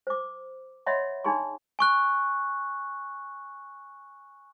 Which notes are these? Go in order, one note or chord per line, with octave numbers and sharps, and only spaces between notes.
C5 D6
C#5 D#5 E5 F#5 B5 C6
D4 D#4 G#4 B5 C6
G#5 C#6 F#6